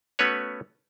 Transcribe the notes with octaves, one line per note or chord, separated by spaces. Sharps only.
A3 B3 C#4 F#4 B4 C#5